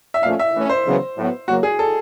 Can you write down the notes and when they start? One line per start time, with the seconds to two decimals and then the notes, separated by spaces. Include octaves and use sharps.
0.14 E5
0.23 A#2 F3 A3 C#4 F5
0.39 E5
0.54 E3 A3 C#4
0.69 C5
0.85 E2 C#3 F#3 B3
1.17 A2 F#3 B3
1.48 C#3 F#3 A#3 F#4
1.63 G#4
1.79 A4